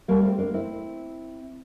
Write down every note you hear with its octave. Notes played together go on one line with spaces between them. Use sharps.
G3 A#3
A3 C4
A#3 D4
C4 E4